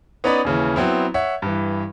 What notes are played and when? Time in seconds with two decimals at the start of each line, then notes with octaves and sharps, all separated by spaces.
0.24 B3 C#4 D#4 B4 D5 B5
0.45 D#2 C#3 E3
0.76 F#3 B3 C4 E4
1.14 C#5 E5 F#5
1.42 G2 E3